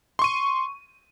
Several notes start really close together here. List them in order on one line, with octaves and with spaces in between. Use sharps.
C6 C#6 D#7